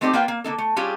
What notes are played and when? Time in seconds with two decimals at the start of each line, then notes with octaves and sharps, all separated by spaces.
0.01 A3 C4 D#4 G4 B4 D5
0.13 A#3 F4 B4 D5 G5
0.28 A#3
0.44 D3 A#3 D#4 A4
0.58 A3
0.76 G3 C#4 D4 F4 G4 G#4